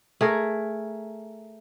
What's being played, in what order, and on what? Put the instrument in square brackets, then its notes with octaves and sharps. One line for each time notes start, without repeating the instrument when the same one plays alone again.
[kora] A3 G#4 A#4